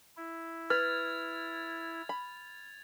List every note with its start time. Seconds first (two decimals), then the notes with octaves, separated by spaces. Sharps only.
0.17 E4
0.70 B4 F6 G#6 A6 F7
2.09 B5